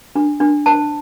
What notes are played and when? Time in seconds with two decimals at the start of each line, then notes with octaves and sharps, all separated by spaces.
0.15 D4
0.40 D4
0.66 C5 A5